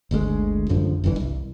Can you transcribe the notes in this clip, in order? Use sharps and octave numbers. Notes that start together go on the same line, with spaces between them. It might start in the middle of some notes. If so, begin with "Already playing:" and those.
G1 D2 B2 G#3
A1 F#2 D3 F3
G1 C2 G2 E3
C2